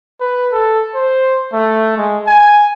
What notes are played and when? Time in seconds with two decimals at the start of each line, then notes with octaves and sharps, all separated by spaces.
0.20 B4
0.52 A4
0.94 C5
1.53 A3
1.97 G#3
2.27 G#5